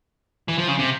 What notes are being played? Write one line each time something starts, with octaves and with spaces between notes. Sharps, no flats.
E3
F3
C#3
C3